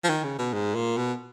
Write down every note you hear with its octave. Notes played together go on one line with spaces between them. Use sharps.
F3
D#3
C#3
B2
G#2
A#2
B2